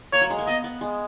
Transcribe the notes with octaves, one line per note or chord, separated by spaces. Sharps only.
A#3 C#5
F#3
G#3
A#3
B3 D#5
B3
G#3